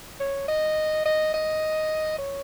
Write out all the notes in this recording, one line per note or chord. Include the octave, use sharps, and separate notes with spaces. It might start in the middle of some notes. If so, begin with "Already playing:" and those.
C#5
D#5
D#5
D#5
C#5